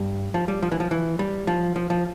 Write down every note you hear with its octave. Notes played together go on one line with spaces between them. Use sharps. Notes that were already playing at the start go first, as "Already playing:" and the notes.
Already playing: G2
F3
G3
F3
E3
F3
E3
G3
F3
F3
F3